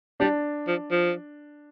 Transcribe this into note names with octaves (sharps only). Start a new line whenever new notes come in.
G3 D4
F3
F3